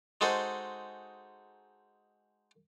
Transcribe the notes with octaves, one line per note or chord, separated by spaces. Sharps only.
G#3 D#4 F#4 A4 C5